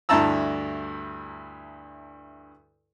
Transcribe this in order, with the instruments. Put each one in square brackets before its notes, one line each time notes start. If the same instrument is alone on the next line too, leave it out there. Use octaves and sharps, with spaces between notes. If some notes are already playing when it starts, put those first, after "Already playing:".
[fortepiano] D2 G2 E4 A5 A#5 E6